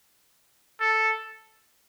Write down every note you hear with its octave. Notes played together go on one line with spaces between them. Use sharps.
A4